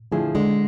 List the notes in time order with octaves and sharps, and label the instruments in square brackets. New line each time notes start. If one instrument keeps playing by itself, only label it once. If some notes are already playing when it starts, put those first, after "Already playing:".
[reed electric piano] D3 A3 E4 G#4 [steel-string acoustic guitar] F3
[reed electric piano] D3 [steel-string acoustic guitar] G#3